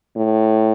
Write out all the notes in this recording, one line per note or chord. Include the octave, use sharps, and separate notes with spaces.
A2